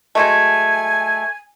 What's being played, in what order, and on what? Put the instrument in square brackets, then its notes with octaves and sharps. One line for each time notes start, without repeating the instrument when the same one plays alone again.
[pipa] F#3 G#3 A3 [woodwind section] G#5